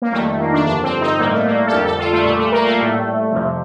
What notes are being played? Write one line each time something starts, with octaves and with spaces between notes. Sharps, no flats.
A#3
F2 D#3 G3 A3
A3
A#3
D4
G2 D3 F3 D4
C4
D#4
A2 G3 A#3
A3
A#3
A4
F2 D3 G3 G4
A4
F4
A3
A#2 G3 A3
A3
A#3
A3
A2 G3
F2 C3 F3